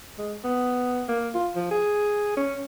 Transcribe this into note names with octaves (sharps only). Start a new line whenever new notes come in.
G#3
B3
A#3
F4
F3
G#4
C#4